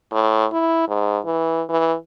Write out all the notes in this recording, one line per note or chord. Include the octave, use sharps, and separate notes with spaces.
A2
E4
G#2
E3
E3